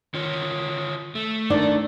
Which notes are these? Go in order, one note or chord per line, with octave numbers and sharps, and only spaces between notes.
D#3 F4 C#5
A3
D#3 D4 D5